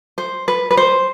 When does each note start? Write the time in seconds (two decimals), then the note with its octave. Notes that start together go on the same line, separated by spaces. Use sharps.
0.18 C5
0.48 B4
0.71 B4
0.77 C5